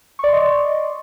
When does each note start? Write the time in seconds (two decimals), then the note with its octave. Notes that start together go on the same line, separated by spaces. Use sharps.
0.19 C#6
0.24 D5
0.28 C6
0.33 D#5